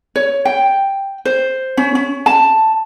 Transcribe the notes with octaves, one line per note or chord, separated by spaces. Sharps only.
C#5
G5
C5
C#4
C#4
A5